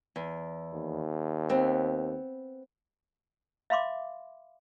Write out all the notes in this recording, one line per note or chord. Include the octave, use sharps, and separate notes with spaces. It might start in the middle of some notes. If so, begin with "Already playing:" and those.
E2
D#2
B3 C4
E5 F5 B5 C6 D6